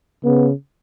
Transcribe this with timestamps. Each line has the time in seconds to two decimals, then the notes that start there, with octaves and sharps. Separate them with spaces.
0.24 C#3 B3